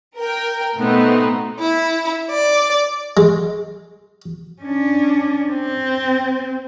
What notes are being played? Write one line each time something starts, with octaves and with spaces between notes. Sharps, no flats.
A#4 G5
B2 A3 B3 C4 D#4
E4
D5
G#3
C#4 D4
C4